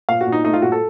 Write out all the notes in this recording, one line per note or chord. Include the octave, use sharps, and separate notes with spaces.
A#2 F5
F#4
A#2
D#4
A3 D#4
F4
A#2 F#4
A4